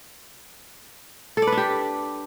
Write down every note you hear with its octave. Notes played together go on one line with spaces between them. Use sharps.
A4
D5
B4
D4
G4